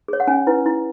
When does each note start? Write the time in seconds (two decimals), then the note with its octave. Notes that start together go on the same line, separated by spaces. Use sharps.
0.08 G#4 C#5
0.20 F#5
0.27 C#4 G#5
0.47 E4 B4
0.66 E4